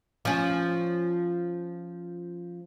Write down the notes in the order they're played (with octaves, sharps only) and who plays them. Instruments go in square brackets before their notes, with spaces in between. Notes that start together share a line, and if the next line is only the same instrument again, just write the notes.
[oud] F3 C#4